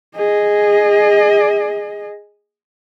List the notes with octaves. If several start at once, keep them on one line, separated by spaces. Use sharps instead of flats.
G#4 D#5